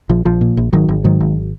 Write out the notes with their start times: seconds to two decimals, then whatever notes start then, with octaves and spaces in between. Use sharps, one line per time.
0.09 A#1 F3
0.25 A#1 F3
0.41 A#2
0.57 A#1
0.73 G#1 D#3 F#3
0.89 G#1
1.04 G#2 D#3 F#3
1.20 G#1